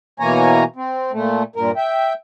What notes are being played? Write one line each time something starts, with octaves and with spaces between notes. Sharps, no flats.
B2 E3 A#3 C#5 G#5 A#5
C4
A#2 A3
G2 A#2 A#4
E5 G5